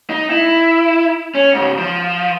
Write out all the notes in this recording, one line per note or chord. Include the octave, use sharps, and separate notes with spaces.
D#4
E4
C#4
G#2 C#3
F3